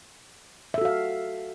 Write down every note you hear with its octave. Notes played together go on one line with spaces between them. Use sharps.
F#4 A4 E5 F5